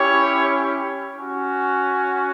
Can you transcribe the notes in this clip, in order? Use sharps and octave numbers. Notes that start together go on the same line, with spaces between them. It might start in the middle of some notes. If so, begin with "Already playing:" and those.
Already playing: C#4 E4 G4 C#5
C#4 F#4